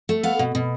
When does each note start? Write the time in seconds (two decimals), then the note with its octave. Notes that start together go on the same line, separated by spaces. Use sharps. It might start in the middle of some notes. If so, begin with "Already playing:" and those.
0.09 A3
0.23 B3 F5
0.39 B2
0.55 B2